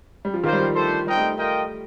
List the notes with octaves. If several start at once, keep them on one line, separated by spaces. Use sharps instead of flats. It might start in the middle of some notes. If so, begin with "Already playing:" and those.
G3
F3
D#3 A#3 F4 C5
G3
F3
A3 D4 A4 C5
G3 C4 D#4 A#4 D#5 G5
A3
F4 A#4 D#5 G5